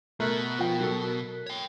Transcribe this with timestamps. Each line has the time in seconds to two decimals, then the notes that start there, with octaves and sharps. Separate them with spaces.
0.20 B2 A3 A#4 F#6 B6
0.59 F3 G5
0.80 F#3 A4
1.47 C#5 G5